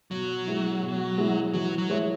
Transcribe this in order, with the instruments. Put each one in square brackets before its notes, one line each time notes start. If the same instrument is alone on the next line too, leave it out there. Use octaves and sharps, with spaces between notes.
[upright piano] B2 [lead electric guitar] F#3
[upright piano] G#3 E4
B2
G#3 E4
[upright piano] E3 [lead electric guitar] F#3
[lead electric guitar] F#3
[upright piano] G#3 E4 C#5 E5